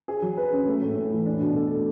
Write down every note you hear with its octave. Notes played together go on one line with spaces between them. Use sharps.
G#4
F#3
B4
C#4
A3
A2
A2
E3
D4
B2
A4
A3